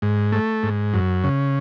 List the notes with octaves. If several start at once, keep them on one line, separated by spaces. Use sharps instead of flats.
G#2
A3
G#2
F#2
C#3